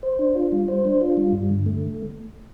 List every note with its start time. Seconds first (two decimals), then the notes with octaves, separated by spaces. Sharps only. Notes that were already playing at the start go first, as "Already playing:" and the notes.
0.03 C5
0.19 D4
0.35 F4
0.52 G3
0.68 C5
0.85 D4
1.01 F4
1.17 G3
1.33 G2
1.49 D3
1.66 A3